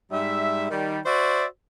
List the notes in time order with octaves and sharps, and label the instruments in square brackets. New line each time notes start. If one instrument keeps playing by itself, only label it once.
[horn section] G#2 G3 E5
D#3 G3
F#4 C5 D5 E5